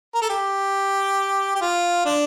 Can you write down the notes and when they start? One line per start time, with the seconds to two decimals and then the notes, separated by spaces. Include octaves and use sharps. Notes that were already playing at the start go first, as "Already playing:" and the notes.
0.15 A#4
0.21 A4
0.29 G4
1.55 G4
1.61 F4
2.05 D4